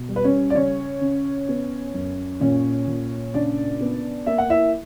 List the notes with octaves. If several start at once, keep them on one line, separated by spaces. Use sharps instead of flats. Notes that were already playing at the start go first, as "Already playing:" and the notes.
Already playing: B2
G3
B4
C#4 C#5
D5
C#3 C#4 C#5
C#3
B3
F#2
A#2 C#4 C#5
A#2
C#3 D4 D5
B3
A#3 E5
F#5
E4 E5